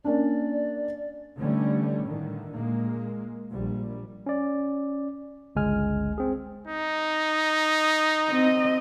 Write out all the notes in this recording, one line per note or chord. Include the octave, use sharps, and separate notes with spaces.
A#3 C#4 D4 D5
D3 E3 G3 A3 C#4
A2 D3 D#3
A#2 G#3 A#3
A#1 G3
C#4 D5
G1 C#2 G#3 G#5 F6
C4 G#4
D#4
C4 D#5